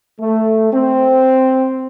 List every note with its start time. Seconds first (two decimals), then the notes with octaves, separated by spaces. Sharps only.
0.21 A3
0.73 C4